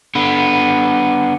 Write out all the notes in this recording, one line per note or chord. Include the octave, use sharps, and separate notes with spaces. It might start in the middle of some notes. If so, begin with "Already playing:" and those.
D3 B3